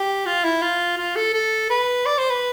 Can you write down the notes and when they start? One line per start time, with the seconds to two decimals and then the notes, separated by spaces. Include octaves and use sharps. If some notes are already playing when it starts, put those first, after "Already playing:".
Already playing: G4
0.26 F4
0.44 E4
0.62 F4
0.98 F4
1.16 A4
1.34 A4
1.70 B4
2.06 D5
2.18 C5
2.30 B4